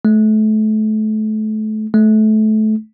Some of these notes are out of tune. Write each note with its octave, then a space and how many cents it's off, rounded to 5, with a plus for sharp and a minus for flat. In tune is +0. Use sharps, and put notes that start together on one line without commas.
A3 -30
A3 -25